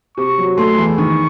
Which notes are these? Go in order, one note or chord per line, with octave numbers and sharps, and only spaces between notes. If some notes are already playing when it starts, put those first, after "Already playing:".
C3 C#6
F#3
A3 C6
E2
D#3 C#6